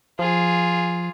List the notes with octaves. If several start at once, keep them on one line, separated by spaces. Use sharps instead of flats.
F3 F4 G#4